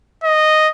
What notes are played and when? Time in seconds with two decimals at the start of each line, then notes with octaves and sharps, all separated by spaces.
0.24 D#5